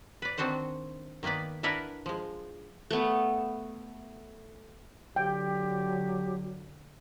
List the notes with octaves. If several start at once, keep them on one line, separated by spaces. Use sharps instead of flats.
B4 D5
D#3 C4 D4 F#4 C5 F#5
D#3 A#3 B3 B4 D5
D4 E4 A#4 B4 F#5
F3 G#3
A3 B3
D3 F#3 G4 G5